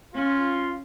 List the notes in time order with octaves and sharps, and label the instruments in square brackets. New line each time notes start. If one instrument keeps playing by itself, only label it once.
[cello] C#4 [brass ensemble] F4